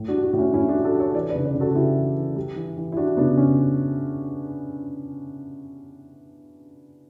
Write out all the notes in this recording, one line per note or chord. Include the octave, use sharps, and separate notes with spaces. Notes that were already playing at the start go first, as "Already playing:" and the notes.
Already playing: A2
D4 F#4
G3
D4 F#4
A2
C#4 E4
A2 C#4 E4
D4 F#4
G3
F#4 A4
G3
A4 C#5
E3 B4 D5
B4 D5
C#3
B4 D5
C#3
F#4 A4
F#4
C#3 E4 G4
E3
E3
G3
E3
E3
E4
E3 D4 F#4
C#3 B3 D4
C#3 C#4